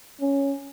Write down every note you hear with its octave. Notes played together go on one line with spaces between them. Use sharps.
C#4